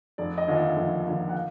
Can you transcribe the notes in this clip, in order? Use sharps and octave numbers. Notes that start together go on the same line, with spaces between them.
F1 D5
D#5
D#2 D3 F3 D#5
E5
F1
D#2 D3 F3
F#5
F5